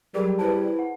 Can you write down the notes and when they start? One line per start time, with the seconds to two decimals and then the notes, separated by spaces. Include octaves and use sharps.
0.15 F#3 G3 G#4 A#4
0.39 E4 B4 C5 A5
0.79 F#5